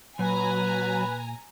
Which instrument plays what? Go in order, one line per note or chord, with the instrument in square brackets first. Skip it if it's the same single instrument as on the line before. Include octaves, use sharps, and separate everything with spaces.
[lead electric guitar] A#2 [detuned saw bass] F#3 [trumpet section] B4 [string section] G#5 A#5